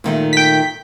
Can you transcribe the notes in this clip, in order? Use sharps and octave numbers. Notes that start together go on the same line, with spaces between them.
A#2 D#3 A3
G5 B6